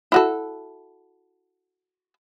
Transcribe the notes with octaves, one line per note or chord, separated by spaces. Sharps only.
E4 F#4 A4